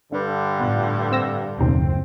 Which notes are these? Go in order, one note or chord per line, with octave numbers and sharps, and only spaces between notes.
G2 D3 D4 B4
A2 B3 F4
C4 E6 A#6
F#1 D#2 B2 F3 C4 C#4 D#4